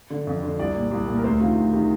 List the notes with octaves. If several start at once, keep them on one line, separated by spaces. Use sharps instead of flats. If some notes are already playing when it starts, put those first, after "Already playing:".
D3
F2
D3
C2 D5
A#2
C2
A#2
A#4
D2 C5
C3 D#3 F4
D2
C3 D#3